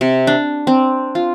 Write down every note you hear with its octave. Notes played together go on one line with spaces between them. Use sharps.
C3
D4
C4
F4